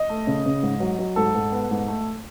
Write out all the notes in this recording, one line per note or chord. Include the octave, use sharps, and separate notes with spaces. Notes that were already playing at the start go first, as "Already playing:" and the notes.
Already playing: D#5
A3
C#3
C#3
G#2
F#3
F#3
G#2 A4
G#2
B3
G#2
A3